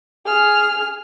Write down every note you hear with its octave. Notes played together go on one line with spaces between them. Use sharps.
G#4 F6